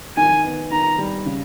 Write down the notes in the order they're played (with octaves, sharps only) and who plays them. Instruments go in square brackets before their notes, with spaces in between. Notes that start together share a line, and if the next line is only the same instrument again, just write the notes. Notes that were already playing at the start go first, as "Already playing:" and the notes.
[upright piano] D#3 [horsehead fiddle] G#5
[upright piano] B3
[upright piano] D#3 [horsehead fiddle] A#5
[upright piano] G3
C#3